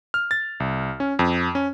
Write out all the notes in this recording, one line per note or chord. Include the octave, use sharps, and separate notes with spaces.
F6
A6
C2
C#4
F2
C#4